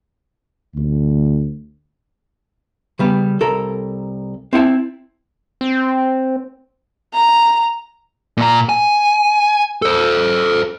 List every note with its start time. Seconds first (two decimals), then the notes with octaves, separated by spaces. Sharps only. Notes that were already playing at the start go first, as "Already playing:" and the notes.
0.75 D2
2.99 C#3 G3 B3
3.41 C2 A4 A#4
4.53 C4 E4 F#5 A5
5.61 C4
7.14 A#5
8.37 A#2 A#5
8.69 G#5
9.82 A4 C5